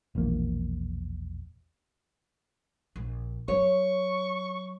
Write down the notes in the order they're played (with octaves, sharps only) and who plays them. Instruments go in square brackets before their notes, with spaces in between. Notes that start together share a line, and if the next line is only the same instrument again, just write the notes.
[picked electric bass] E1 A#1 E2 A#3
[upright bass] A#1
[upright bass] F#3 [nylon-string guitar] C#5 [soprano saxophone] C#6